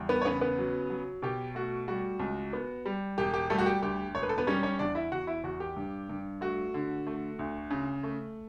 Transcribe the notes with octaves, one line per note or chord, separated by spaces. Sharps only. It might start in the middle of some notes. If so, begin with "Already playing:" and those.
Already playing: E2 G3
B3 B4
C#5
C#3 B3 B4
B3 B4
F#3
F#3
B2 G4
A3 F#4
G3 F#4
C#2
B3
G3
E1 G4
G4
G3 A3 A4
F#4
G4
D2 G4
E1 C#5
B4
A4
B3 B4
G3 C#4 C#5
C#4 C#5
E2 D4 D5
E4 E5
E2 F#4 F#5
E4 E5
E2 F#4
G4
G2
G2
A3 F#4
D3
A3
D2
C#3
A3